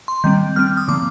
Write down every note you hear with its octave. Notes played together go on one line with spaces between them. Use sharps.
C6
D#3 G3 C4 G6
G3 C4 F6
F6
D#6
D3 F3 A#3 D6